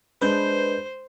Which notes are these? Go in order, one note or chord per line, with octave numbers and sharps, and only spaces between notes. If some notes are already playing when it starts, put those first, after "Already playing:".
G#3 D4 B4 C5 G6